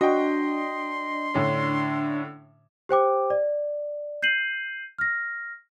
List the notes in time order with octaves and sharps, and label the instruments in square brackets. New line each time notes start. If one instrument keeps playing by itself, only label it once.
[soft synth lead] D4 [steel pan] F#4 [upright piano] D#5 G5 [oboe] C6
[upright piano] A2 D3 C#4
[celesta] G4 C5 G5 D6
D5
G6 C7 D#7 F#7
F6 A#6